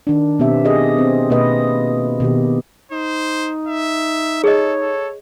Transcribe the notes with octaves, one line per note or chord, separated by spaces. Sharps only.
D#3 D4
B2 B3 C4 G4 E5
G4 G#4 D#5
C4
B2 A#3 B4 D#5
B2 D#3 G4
D#4 C5
E5
G#4 A4 C#5 D#5
A4